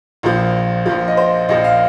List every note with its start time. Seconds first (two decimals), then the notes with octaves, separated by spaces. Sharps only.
0.23 A#1 A#2 F3
0.86 A#1 A#2 F3
1.08 D#5
1.17 C5
1.49 A#1 A#2 F3 D#5
1.64 F5